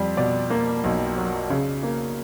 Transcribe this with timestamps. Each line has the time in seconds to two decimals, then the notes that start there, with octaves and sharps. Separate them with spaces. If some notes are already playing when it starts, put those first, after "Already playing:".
Already playing: F2 G3
0.17 B2 D5
0.50 A#3
0.84 B1
1.17 F#3
1.50 C#3
1.83 A#3